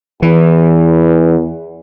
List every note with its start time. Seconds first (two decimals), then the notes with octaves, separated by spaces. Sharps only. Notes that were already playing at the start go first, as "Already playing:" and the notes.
0.22 E2 E3